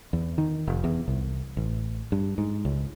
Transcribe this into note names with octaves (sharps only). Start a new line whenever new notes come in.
E2
D#3
F1
E2
C2
A1
G2
G#2
C#2